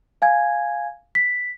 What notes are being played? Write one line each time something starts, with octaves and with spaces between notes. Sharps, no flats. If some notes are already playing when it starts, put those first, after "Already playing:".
F5 G#5 G#6
B6